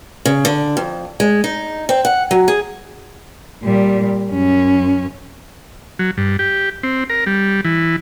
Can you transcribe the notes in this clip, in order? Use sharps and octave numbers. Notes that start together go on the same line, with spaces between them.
C#3
D3
F2
G#3
D#4
C4
F#5
F#3
G#4
A#2 G3
F#2 C#4
F#3
G2
G4
C4
A#4
G3
E3